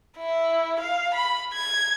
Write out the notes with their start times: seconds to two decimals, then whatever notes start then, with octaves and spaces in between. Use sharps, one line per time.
0.18 E4
0.79 F5
1.14 B5
1.54 G#6